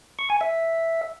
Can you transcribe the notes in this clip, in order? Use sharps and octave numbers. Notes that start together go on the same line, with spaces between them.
C#6
G#5
E5